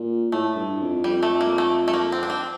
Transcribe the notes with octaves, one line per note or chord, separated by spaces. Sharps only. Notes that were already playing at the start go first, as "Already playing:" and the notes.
Already playing: A#2
A2 A3
G2
F2
F2 G3
A3
A#3
A3
A3
A#3
C4
D4
C4